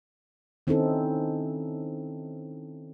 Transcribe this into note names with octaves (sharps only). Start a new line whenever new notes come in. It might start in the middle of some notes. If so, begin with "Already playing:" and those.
D#3 C4 C#4 D#4 E4 A4